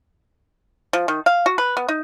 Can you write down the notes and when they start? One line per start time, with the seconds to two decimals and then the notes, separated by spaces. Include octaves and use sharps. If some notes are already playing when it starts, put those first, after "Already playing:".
0.93 F3
1.08 D#3
1.26 F5
1.46 F#4
1.58 B4
1.77 B3
1.88 D#4